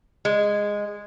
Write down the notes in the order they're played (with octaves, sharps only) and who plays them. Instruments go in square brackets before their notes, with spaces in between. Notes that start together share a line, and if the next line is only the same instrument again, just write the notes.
[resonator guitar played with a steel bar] G#3